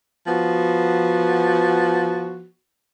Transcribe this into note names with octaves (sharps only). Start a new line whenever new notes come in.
F3 B3 F#4